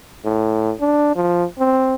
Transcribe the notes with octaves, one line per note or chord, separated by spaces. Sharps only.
A2
D4
F3
C4